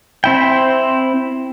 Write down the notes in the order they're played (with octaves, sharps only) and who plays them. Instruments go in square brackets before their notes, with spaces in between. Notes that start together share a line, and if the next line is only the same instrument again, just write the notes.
[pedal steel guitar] C4 E4 G5